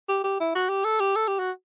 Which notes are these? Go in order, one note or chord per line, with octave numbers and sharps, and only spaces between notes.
G4
G4
E4
F#4
G4
A4
G4
A4
G4
F#4